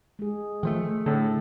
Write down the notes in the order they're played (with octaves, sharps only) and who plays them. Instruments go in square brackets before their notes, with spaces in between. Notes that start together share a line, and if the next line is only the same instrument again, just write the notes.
[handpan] G#3 G#4
[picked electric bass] D#3 F3 A3
A3
[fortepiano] A2 A4 [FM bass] D3